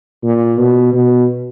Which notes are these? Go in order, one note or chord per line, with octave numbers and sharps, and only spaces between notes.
A#2
B2
B2